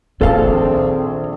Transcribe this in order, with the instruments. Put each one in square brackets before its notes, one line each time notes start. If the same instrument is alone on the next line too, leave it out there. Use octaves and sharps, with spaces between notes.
[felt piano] A#1 G#4 [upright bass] D#3 [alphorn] C4 [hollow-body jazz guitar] A4 F5 A5